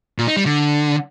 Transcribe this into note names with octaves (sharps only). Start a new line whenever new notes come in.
A#2
D#4
G3
D3